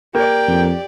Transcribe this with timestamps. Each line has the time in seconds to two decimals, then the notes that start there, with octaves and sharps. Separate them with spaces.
0.15 A#3 G4 D5 G5
0.48 F2